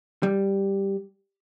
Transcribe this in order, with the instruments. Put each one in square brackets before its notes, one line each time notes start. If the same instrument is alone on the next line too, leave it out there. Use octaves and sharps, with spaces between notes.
[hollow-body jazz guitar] G3